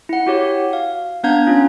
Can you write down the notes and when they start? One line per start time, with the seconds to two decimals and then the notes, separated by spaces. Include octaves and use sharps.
0.09 E4 F#5
0.26 F#4 G4 C#5
0.73 F5
1.24 B3 D4 F5 A#5 G6 G#6
1.47 C#4 F4